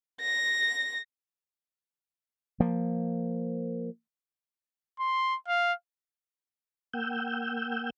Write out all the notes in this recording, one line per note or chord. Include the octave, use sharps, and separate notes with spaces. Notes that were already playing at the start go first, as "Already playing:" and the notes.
A#6
F3 A#3
C6
F5
A#3 F#5 G5 E6 G6